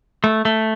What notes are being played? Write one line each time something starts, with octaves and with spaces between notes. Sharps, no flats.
A3
A3